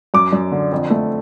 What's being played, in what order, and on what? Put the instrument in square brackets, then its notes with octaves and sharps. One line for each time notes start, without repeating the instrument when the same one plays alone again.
[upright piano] F#2 D6
F#2
D3
F2
A3